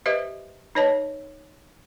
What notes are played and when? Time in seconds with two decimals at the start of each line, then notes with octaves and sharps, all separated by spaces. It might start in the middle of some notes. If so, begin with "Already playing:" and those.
0.06 G4 B4 C5 D#5 E5
0.75 D#4 B4 C#5 D#5 A5